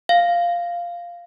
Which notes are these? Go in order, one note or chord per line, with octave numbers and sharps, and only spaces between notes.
F5